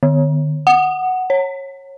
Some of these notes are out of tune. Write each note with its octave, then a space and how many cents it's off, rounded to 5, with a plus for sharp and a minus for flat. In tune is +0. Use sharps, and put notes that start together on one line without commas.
D3 +45
F#5 +5
C#5 -20